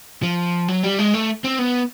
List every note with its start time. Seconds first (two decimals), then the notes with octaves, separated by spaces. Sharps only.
0.23 F3
0.68 F#3
0.84 G3
0.99 G#3
1.14 A3
1.44 C4
1.59 B3